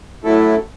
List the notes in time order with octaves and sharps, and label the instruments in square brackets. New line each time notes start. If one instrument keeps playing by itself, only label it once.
[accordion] A2 F#3 A3 E4 A4